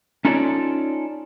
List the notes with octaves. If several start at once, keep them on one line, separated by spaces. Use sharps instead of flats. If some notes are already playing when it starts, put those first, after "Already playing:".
C#4 D#4 F4 A4 C#5 D5